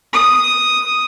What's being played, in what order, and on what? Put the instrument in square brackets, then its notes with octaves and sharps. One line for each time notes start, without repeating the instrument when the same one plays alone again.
[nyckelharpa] D#6